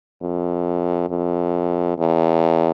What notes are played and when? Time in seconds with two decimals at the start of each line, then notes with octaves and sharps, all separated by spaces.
0.22 F2
1.10 F2
1.98 E2